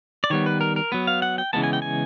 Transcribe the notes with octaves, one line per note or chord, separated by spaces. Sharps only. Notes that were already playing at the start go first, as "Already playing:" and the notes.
D5
D#3 G3 B3 C#5
B4
A#4
A#4
F#3 B3 B4
F5
F#5
G5
C#3 E3 G#3 B3 A5
G#5
G5
G#5